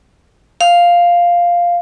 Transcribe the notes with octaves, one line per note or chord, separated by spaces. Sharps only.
F5